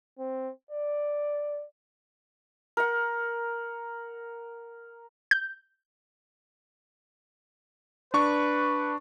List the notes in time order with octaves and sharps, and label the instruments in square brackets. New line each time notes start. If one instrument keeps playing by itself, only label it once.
[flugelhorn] C4
D5
[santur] A#4 F#5
[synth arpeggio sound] G6
[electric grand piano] D4 C#6 [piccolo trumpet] B4